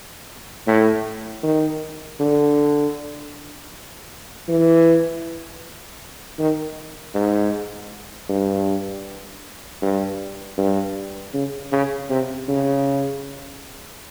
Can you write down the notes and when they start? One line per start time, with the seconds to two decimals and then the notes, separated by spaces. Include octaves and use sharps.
0.67 A2
1.43 D#3
2.20 D3
4.48 E3
6.39 D#3
7.15 G#2
8.29 G2
9.82 G2
10.58 G2
11.34 C#3
11.72 C#3
12.10 C3
12.48 C#3